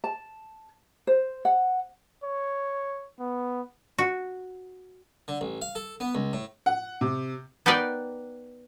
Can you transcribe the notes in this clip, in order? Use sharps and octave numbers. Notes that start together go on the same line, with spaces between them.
A5
C5
F#5
C#5
B3
F#4
D3
A1
F5
A4
B3
C#2
A2
F#5
C3
B3 D#4 A#4 B4 D5 G5